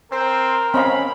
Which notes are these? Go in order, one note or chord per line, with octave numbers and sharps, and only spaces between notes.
C4 A#4 C5
C4 C#4 D#5 F5 B5